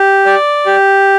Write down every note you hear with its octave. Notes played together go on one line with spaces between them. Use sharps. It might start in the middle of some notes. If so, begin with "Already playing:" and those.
Already playing: G4
D5
G4